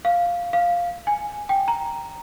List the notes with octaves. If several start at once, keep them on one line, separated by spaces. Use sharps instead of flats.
F5
F5
G#5
G5
A#5